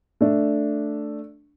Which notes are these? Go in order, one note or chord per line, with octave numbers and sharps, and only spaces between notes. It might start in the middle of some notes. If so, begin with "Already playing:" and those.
A3 D4